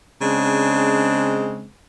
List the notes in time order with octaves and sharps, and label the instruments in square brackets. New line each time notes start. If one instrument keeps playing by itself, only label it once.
[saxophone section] C#3 G#3 C4 D4